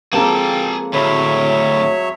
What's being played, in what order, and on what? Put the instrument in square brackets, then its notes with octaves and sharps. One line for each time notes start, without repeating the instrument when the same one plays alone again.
[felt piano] F3 G#3 C4 [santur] A#3 A4 [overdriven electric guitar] G#4 A5 [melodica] G5
[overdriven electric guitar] D2 A2 [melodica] F#3 C#5 E5 [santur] B5